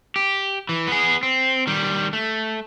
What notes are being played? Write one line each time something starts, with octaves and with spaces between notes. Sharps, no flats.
G4
E3
B3 G#4
C4
D#3 G3
A3